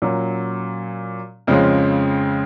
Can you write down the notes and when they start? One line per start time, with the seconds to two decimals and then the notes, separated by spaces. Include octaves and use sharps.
0.02 A#2 F#3 C#4
1.47 F2 C#3 F3 G#3 C#4